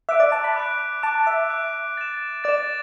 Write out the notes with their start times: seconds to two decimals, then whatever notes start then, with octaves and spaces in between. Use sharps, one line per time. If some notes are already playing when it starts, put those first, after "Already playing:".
0.09 E5 D6 F#6 D7
0.20 D5
0.32 A5
0.44 B5
0.56 D6 F#6 D7
1.03 A5 D6 F#6 D7
1.27 E5
1.50 D6 F#6 D7
1.97 A6 E7
2.44 D5 A6
2.49 E7